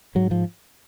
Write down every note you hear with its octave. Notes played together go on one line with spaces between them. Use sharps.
G#2 F#3
F3